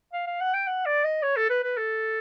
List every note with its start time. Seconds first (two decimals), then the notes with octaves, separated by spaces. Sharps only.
0.13 F5
0.27 F5
0.40 F#5
0.54 G5
0.67 F#5
0.86 D5
1.04 D#5
1.22 C#5
1.36 A4
1.50 B4
1.63 B4
1.77 A4